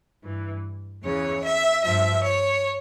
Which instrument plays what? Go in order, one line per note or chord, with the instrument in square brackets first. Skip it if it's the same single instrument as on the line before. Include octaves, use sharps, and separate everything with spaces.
[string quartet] G2 E3
E2 C#3 E3 C#5
E5
G2 F3 E5
C#5